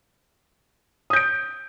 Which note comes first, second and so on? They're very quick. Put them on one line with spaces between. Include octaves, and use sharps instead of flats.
D#6 G6 D7